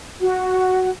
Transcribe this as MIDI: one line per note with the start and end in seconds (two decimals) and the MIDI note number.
0.20 0.89 66